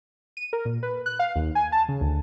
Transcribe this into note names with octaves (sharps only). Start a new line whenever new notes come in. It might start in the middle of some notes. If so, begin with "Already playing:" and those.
D#7
A#4
A#2
B4
F#6
F5
D#2
G#5
A5
C#3
D2